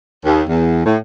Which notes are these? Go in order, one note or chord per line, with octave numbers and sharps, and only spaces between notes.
D#2
E2
A2